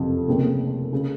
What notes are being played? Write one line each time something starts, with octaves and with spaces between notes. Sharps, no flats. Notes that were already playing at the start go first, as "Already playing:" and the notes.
Already playing: F#1 F2 C3 F3
F1 D#2 C#3 G#3 C4
C#3 G#3